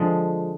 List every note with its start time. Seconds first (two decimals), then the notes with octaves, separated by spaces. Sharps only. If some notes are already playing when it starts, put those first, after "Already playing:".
Already playing: D3 F3 G#3